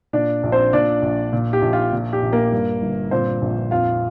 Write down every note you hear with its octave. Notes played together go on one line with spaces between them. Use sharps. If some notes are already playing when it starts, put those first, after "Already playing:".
A#2 D4 D5
A#1
C4 C5
A#2 D4 D5
A#1
A#2
G4
A#1
F4
A#2
G4
A#1
A#3 A#4
G2
G1
A#2 C4 C5
A#1
F2 F4 F5